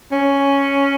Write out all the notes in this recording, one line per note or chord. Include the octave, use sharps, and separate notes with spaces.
C#4